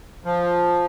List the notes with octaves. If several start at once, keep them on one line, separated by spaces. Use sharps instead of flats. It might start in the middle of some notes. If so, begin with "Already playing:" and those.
F3